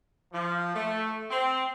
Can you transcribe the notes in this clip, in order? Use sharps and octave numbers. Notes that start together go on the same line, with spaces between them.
F3
A3
C4